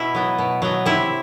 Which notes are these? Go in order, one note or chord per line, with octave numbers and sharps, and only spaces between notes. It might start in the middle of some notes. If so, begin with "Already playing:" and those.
Already playing: B2 E4
F#3 B3
B2
F#3 B3
C3 E4